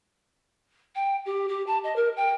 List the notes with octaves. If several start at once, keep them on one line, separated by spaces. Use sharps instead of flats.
G5
G4
G4
A5
D#5
A#4
G5